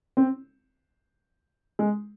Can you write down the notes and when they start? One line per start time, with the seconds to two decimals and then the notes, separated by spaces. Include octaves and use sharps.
0.17 C4
1.79 G#3